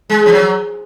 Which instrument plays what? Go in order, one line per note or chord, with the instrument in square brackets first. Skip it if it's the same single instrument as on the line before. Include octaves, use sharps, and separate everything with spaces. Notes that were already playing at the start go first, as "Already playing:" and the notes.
[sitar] G#3
F3
F#3